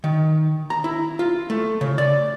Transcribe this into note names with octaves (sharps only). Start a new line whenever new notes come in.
D#3
A#5
E4
F4
A3
C#3
D5